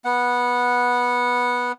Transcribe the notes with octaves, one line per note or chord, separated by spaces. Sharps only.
B3 F#5